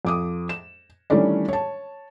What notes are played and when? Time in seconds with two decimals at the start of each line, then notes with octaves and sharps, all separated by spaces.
0.05 F2 D6 D#6
0.49 E7
1.10 D#3 E3 G3 A3 C#4 D4
1.49 C#5 A5